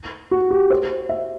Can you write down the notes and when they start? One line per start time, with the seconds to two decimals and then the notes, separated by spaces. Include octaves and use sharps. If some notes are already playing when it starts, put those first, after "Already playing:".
0.31 F#4
0.51 G4
0.70 C5
1.09 E5